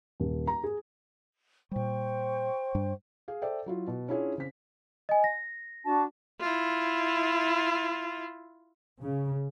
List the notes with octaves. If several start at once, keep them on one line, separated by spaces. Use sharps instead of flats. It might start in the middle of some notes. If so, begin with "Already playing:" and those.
D#1
A#5
G#4
A#2 G3 C5 G5 C#6
G2 G3 D4
G#4 F5
A4 C5 D5 E5 G5
F#3 E4 F4
B2
C#4 D4 E4 F4 G#4 C#5
C#3 C4 B6
D#5 G#5
A#6
D4 F#4 A5
E4 F4
C#3